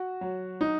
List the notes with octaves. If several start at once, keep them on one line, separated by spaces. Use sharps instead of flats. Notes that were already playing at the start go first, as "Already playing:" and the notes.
Already playing: F#4
F#3
D#4